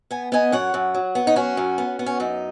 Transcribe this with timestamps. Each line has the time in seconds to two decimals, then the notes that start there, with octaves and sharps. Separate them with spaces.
0.11 B3 G#5
0.32 B3 D#5 G#5
0.52 F#2 C#5 F#5
0.74 F#2
0.94 F#3
1.15 B3
1.27 D#4
1.36 F#3 C#4 F#4
1.57 F#2
1.78 B3
1.99 B3
2.06 C#4
2.20 F#2 D#4